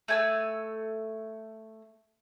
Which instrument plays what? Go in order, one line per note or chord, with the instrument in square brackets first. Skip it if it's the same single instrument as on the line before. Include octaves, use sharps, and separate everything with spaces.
[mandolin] A3 G#5 E6